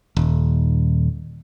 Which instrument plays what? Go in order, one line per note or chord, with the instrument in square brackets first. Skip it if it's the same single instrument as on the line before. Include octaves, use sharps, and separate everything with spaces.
[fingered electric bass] D#1